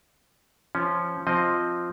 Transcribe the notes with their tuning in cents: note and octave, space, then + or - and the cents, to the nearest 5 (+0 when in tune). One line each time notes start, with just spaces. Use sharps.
F3 -15 C#4 +0
F3 +0 C4 +0 D#5 +0